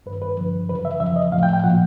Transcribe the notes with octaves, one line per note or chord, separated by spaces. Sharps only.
G2 D#3 B4
B4
G2 D3 F3
F#2 C#3 E3 B4
E5
F2 C#3 F3 E5
D#5
A2 F3 F5
G5
G5
A#2 F3 F#5